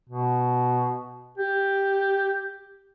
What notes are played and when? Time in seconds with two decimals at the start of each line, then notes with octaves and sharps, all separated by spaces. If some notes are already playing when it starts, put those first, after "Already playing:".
0.09 B2
1.38 G4